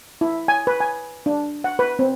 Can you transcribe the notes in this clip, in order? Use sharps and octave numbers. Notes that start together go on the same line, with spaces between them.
E4
G#5
B4
G#5
D4
F#5
B4
C4